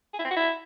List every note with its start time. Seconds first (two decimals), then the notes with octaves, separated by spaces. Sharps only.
0.13 G#4
0.19 E4
0.25 C4
0.31 F#4
0.37 E4